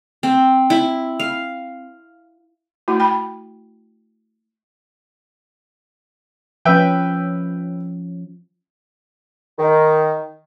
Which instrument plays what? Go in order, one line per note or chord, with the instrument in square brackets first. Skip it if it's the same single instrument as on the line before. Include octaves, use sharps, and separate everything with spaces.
[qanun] C4
E4
F5
[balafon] A3 E4 F#4
G5 B5
[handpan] F3 C#4 [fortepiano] B4 E5 G5
[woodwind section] D#3